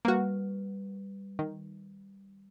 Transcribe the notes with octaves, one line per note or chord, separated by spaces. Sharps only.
G3 A#3 F#4 B4 F6
D#3